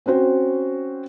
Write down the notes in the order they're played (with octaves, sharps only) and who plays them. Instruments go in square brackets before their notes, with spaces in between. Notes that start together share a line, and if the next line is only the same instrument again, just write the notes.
[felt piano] C4 C#4 F#4 C5